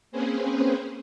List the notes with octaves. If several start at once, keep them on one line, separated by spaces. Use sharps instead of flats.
A#3 C4 C#4 G#4 B4 C5